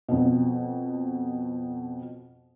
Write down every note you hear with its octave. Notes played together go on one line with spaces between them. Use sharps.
F2 B2